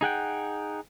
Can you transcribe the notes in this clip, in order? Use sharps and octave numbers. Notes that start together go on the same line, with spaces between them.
D#4 G#4 F#5 G5